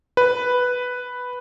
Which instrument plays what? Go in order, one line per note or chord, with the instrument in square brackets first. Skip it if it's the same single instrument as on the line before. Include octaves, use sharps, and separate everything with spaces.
[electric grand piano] B4